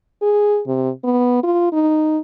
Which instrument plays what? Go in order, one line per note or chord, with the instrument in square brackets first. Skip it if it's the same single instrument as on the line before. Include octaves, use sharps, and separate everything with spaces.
[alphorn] G#4
C3
B3
F4
D#4